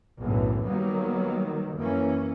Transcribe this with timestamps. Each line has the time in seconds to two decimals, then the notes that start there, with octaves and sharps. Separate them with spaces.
0.21 B1 F#2 A2 D3 E3
0.67 D#3 F#3 G3 A#3 B3
1.77 F#2 E3 A#3 C#4